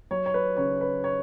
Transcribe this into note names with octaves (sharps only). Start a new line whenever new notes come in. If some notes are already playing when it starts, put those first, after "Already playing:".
F#3 C#5
C#5
B4
C#3 C#5
B4
C#5